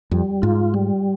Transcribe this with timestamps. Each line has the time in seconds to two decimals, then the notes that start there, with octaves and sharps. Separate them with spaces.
0.11 F2 G3
0.42 G#2 F4
0.74 G3